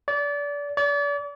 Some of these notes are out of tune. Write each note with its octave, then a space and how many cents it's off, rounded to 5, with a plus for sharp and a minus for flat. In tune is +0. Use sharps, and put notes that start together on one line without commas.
D5 -30
D5 -40